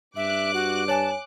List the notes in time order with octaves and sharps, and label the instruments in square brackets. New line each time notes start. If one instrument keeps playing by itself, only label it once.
[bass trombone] G2 [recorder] E5 [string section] D6 F#6
[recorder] F#4
[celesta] C#5 G#5 [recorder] A5